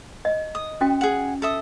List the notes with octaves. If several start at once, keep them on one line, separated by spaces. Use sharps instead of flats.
D#5
D#6
C#4 F#4 G5
G#4 F#5
A4 E5 D#6